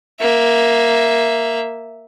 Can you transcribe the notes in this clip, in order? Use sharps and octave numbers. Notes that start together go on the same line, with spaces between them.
A#3 E5